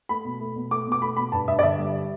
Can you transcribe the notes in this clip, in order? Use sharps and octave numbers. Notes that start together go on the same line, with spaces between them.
A3 B5
B2
A3
B2
A3 D6
B2
D6
A3 B5
B2 B5
G2 A5
G2 E5
D5
D3 E5
G3